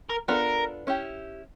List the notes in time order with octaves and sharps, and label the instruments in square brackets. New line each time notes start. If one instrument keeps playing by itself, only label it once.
[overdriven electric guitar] A#4
[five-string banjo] B3 D4 F4 A4 [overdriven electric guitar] A#4
[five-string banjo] C#4 E4 G4